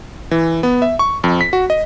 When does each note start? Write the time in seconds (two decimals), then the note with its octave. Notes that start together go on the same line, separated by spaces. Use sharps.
0.31 E3
0.63 B3
0.82 E5
0.99 C#6
1.24 F2
1.41 B6
1.53 F#4
1.70 D#5